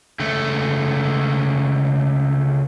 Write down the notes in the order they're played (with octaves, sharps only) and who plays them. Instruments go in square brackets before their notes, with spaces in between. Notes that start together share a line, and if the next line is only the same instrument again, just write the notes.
[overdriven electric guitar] C#2 A3